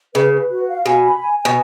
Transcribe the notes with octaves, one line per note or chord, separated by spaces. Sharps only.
C#3 B4
B4
F#4
F5
B2 G#5
B5
G#5
G#5
B2